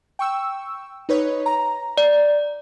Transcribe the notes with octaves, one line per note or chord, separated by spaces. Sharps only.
G5 C#6 E6
D#4 B4 C#5
A#5
D5